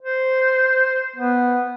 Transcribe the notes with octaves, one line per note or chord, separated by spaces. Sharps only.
C5
B3